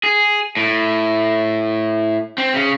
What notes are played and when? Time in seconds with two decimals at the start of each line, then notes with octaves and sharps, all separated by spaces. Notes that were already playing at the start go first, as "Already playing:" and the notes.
0.04 G#4
0.57 A2
2.38 C4
2.54 C#3